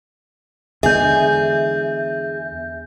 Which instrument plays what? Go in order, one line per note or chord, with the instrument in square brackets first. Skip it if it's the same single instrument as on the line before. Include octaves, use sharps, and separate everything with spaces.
[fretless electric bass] E2 D3 G#3 [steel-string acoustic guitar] G#4 [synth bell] E5 G6